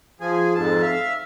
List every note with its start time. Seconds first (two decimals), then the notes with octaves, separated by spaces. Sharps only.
0.21 F3 G#4
0.55 F2 G#2 A5
0.82 E5 F5